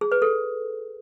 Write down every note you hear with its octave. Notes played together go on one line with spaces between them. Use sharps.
G#4
B4
A4